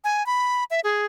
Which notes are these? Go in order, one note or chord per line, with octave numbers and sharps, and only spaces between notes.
G#5
B5
E5
G#4